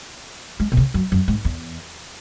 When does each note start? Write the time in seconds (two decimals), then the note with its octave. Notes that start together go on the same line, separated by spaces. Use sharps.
0.60 G#3
0.72 B2
0.77 C#3
0.94 F#2
1.12 F#2
1.28 G#2
1.45 E2